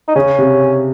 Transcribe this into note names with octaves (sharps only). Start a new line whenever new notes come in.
D#4
C#3 C#4
C3